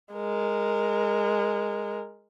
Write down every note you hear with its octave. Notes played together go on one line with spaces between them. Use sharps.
G#3 A#4